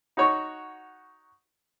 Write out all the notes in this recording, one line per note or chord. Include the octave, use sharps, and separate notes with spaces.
D#4 F#4 C#5